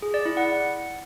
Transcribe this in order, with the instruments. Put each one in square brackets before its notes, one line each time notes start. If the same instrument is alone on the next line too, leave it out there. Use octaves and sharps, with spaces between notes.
[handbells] G#4
D5
E4
F#5